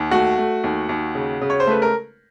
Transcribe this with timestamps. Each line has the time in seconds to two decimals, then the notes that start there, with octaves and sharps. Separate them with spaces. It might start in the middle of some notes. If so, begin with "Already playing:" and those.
Already playing: D#2
0.11 A3 F#4
0.38 A3
0.64 D#2
0.89 D#2
1.15 C#3
1.41 C#3
1.50 C#5
1.60 C5
1.67 A3 B4
1.82 A#4